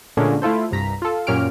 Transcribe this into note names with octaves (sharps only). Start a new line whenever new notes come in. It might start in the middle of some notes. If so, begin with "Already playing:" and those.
A#2 D3 G#3 A3 C#4 D4
A3 E4 F4 A4 C5
C2 G2 A#5 B6
F4 A4
F#2 A#2 C#4 G4 F6 D7